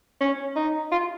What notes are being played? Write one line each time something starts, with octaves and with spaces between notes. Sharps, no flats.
C#4
D#4
F4